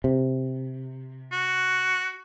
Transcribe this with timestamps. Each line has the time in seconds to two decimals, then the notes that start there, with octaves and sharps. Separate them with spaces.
0.04 C3
1.32 F#4